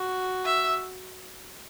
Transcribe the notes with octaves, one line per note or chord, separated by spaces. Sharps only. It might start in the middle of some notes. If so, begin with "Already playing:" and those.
Already playing: F#4
E5